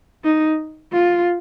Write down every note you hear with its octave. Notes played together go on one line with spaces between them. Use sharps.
D#4
F4